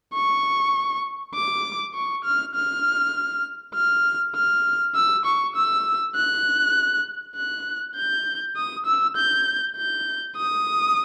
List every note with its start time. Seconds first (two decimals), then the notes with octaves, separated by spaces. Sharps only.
0.13 C#6
1.34 D6
1.94 C#6
2.24 F6
2.55 F6
3.75 F6
4.35 F6
4.95 E6
5.25 C#6
5.56 E6
6.16 F#6
7.36 F#6
7.96 G6
8.56 D#6
8.86 E6
9.17 G6
9.76 G6
10.37 D#6